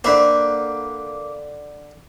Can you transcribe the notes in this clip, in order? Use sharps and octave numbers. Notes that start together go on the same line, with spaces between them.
D3 A#3 B4 C5 E5